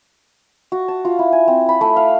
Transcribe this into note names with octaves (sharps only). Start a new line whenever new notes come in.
F#4
A5
F4
E4
G#5
C4
B5
A3
F5